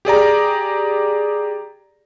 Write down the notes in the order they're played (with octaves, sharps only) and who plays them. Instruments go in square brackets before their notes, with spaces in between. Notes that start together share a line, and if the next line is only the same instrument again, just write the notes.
[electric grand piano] G4 G#4 D5 A#5